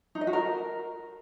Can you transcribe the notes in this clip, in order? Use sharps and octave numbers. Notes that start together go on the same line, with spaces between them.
D#4
D#5
F#4
A#4